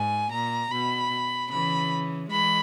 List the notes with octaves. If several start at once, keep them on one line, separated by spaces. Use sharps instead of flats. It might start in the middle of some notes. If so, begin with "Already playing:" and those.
Already playing: G#2 G#5
A#2 A#5
B2 B5
C#3 E3 B5
E3 G#3 B5